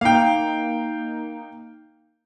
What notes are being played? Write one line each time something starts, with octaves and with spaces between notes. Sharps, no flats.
A#3 D#4 F5 G5